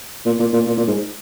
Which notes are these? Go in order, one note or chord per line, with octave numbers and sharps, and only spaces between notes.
A#2
A#2
A#2
A#2
A#2
G#2